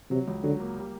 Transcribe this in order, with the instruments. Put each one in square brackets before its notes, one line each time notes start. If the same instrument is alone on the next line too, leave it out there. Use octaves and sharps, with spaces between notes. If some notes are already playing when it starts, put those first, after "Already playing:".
[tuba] C3 [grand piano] F#3
[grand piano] C#2
[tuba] D3 [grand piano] F#3
[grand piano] A#3
G3